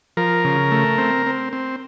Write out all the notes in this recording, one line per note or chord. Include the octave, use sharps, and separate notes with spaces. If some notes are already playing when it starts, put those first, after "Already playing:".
F3 A#4
C#3
A3
C4
C4
C4